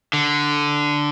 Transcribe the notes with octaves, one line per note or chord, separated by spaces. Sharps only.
D3